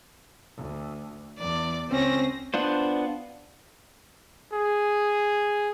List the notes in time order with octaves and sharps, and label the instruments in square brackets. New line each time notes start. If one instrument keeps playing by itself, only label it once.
[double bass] D2
[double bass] E2 [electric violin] D5
[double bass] C#2 C#4 [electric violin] C4 A#6
[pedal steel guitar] B3 D4 F4 C5
[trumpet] G#4